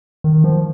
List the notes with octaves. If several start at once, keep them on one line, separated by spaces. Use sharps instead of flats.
D#3
F3